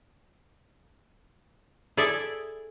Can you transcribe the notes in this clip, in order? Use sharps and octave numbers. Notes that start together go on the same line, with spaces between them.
E4 G#4 A4 D5 E5